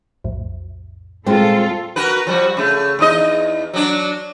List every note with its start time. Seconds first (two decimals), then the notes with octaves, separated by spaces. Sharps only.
0.24 B1 F2 A2
1.27 A#2 G3 G#3 C4 F4 A4
1.96 F#4 A#4 B4
2.27 F3 G3 F#4
2.57 C#3 A3
2.99 E2 D#4 D#5
3.74 F#3 D4